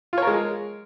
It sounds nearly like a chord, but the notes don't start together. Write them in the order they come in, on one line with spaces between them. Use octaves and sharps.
F4 C#5 A#4 G#3